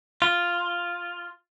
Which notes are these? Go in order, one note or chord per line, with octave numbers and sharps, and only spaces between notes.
F4